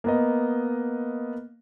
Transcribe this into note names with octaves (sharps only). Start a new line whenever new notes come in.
A#3 B3 D#5